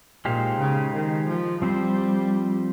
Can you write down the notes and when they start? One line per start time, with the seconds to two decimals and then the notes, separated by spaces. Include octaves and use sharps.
0.25 A#2 G#3 D#4 G4 C5 F5
0.59 C#3
0.94 D#3
1.28 F3
1.61 F3 G3 C4 G4 C5